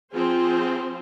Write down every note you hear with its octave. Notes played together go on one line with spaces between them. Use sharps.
F3 C4 F4 G#4 C5